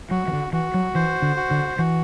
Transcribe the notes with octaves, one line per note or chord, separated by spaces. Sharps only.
F#3 F#4
E3
D3
E3 F#4
F#3
E3 C5
D3
F#4
D3
E3 F#4